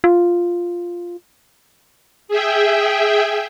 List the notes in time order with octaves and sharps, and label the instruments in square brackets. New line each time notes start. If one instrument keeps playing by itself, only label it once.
[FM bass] F4
[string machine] G#4 E5 G5